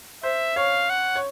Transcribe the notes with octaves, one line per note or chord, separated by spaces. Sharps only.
C5 E5
C#5 F5
F#5
C#5